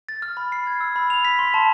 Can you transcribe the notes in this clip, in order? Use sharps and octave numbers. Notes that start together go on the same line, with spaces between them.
A6
F6
B5
C7
G#6
E6
B5
F7
B6
C6
A5